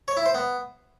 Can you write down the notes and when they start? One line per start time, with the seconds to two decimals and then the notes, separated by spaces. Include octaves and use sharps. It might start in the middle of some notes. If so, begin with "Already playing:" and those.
0.08 C#5
0.17 E4
0.26 C5
0.34 B3